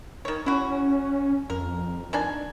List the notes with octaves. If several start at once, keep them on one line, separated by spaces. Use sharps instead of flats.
D#3 C#5
C#4 E4 F#4
F2 A#4
D#3 D4 G#5